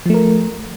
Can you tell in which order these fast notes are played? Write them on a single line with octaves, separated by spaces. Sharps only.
F3 A3 A#4